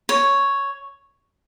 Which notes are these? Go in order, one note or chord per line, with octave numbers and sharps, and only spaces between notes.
C#5